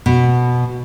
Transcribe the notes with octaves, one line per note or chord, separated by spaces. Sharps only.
B2